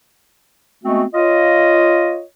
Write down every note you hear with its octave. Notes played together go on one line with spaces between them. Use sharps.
G#3 A3 B3 C4 F#4
F4 C#5 D#5